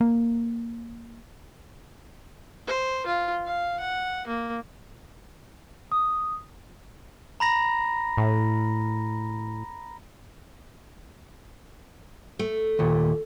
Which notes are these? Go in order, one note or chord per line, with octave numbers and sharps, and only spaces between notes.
A#3
C5
F4
F5
F#5
A#3
D#6
A#5 B5 A#6
A2
A3
D#2 A#2